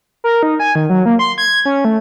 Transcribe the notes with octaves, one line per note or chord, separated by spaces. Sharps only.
A#4
D#4
G#5
D#3
F#3
A#3
C6
G#6
C#4
A3